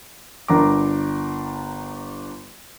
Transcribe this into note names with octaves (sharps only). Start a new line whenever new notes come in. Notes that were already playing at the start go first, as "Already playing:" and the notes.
G1 D4 A#4 A#5 D6